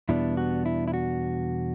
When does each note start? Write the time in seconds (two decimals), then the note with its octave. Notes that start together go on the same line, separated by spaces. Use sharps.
0.09 E2 B2 G3 B3 D4 E4
0.37 F#4
0.66 E4
0.88 E4
0.94 F#4